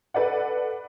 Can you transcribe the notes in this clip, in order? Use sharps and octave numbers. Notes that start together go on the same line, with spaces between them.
A4 B4 D5 F#5